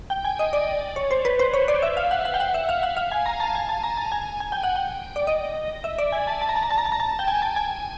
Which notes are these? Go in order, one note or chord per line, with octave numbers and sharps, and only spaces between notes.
G5
G#5
D#5
D5
C#5
C5
B4
C5
C#5
D5
E5
F5
F#5
F#5
G5
F#5
E5
F5
F#5
F5
G#5
A#5
A5
G#5
A5
A#5
A5
G#5
G#5
G5
F#5
G5
D5
D#5
E5
D5
G#5
A5
A5
A#5
A5
A#5
A5
A#5
A5
A#5
A5
G5
G#5
A5
G#5